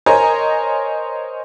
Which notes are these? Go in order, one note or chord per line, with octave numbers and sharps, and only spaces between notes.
A#4 C5 C#5 D#5 G#5 A#5